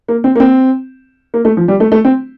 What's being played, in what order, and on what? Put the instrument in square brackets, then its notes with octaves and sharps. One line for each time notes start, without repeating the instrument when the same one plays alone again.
[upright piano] A#3
C4
A#3
C4
A#3
A3
F3
G3
A3
A3
C4